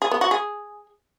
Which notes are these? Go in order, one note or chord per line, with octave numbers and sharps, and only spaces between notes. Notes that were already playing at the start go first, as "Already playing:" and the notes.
G#4
B3
F#4
G#4